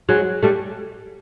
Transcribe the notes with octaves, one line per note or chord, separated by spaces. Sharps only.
F#3 G#3
G3 A3